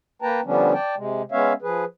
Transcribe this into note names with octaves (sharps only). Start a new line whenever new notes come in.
A#3 B4 G5 A5 A#5
D3 F3 G3 B3 C#4 D4
D5 G5 A5
C3 G#3
G#3 B3 C#4 C#5 E5 F5
F3 G#4 B4